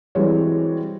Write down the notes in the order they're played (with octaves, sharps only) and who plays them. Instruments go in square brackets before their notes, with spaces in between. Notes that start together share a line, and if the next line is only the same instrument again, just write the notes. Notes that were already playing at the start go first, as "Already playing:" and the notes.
[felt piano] E3 G3 G#3 C4 F#4 C#5